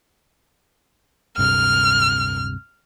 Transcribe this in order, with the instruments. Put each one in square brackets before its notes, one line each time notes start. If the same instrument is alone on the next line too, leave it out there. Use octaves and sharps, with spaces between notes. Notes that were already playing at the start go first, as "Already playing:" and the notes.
[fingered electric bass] D1 G2 C3 [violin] F6